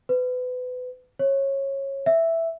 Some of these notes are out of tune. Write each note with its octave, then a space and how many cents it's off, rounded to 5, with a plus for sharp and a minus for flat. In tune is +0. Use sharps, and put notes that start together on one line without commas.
B4 +30
C#5 -20
E5 +0